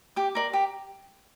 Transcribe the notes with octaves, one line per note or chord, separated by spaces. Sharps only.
G4 D6
A#4 D5
G4